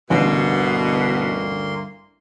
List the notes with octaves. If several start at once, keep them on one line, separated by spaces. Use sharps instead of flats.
A1 D2 G2 B2 D3 A#3 B3 C6